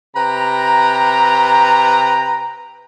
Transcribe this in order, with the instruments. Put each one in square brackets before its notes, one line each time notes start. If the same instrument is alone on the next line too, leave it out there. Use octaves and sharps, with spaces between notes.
[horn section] C3 B4 G5 A#5